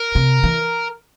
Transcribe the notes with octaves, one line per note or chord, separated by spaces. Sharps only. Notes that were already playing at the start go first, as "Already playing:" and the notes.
Already playing: A#4
C3
E3